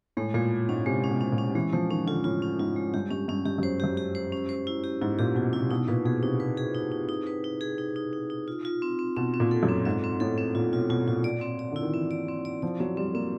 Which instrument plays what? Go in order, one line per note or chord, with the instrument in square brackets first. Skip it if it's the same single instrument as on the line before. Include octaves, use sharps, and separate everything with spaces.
[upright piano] A2 [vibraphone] G#3
[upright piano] A#2 [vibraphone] G#3
[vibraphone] G#3
[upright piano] G#2 [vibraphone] C#4
[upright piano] C3 [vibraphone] G#3
[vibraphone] C#4
[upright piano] B2
[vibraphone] C#4
[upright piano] A#2
[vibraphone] C#4
[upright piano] E3 [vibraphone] G#3
[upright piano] F3 [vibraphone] G#3
[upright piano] D#3 [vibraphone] C#4
[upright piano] D3 [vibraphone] F4
[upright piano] A2 [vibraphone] F4
[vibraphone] C#4
[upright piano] G#2 [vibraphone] F4
[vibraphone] G#3
[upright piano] G2 [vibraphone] G4
[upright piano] G2 [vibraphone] C#4
[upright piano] G2 [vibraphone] C#4
[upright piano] G2 [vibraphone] G4
[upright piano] F#2 [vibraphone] C5
[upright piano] F#2 [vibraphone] G4
[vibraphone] G4
C5
C#4
C5
E4
G4
[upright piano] G#2 [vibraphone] E4
[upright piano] A#2 [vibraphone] G4
[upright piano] B2 [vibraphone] E4
[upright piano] C3 [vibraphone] E4
[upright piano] B2 [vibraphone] D#4
[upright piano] A#2 [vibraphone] B4
[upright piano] B2 [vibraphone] G#4
[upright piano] C3 [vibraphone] D#4
[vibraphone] B4
G#4
D#4
D#4
D#4
B4
D#4
G#4
D#4
D#4
D#4
D#4
F4
F4
C4
C4
[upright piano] B2 [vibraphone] C4
[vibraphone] C4
[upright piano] A#2
[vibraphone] A4
[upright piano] F#2
[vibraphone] C4
[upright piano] G#2 [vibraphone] C4
[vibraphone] C4
[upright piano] A2 [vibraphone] A4
[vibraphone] C4
[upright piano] A#2 [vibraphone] F4
[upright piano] B2 [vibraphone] F4
[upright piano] B2 [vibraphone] F4
[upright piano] A#2 [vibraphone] F4
[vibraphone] D5
C4
D5
[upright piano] D3 [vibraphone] E4
[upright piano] D#3
[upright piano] E3 [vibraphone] C4
[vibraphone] D5
C4
D5
[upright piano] F3 [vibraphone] D5
[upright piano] F#3 [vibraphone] C4
[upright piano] G3 [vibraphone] C4
[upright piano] A#3 [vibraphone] C4